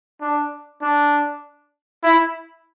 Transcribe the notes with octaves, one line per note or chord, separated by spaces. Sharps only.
D4
D4
E4